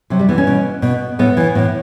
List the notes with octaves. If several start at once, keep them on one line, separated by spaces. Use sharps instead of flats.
C3 F#3
G3
E3 B3
C#4
B2
B2
A2 B3
E3
A2